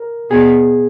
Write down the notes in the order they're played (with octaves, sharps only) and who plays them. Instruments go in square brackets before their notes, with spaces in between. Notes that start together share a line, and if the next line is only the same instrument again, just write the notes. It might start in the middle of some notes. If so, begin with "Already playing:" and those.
Already playing: [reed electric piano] A#4
[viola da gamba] B2 [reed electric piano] G#4